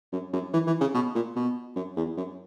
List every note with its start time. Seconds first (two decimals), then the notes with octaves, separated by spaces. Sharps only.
0.12 F#2
0.33 F#2
0.53 E3
0.67 E3
0.81 C#3
0.94 B2
1.15 A#2
1.36 B2
1.76 F#2
1.96 E2
2.17 F#2